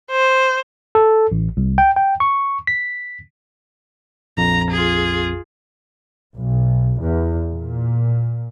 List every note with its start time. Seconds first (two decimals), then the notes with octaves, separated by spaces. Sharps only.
0.11 C5
0.95 A4
1.32 A1
1.57 C2
1.78 G5
1.96 G5
2.20 C#6
2.67 B6
4.37 A#1 F2 A#5
4.71 F4 G#4
6.35 B1
7.01 E2
7.49 A#2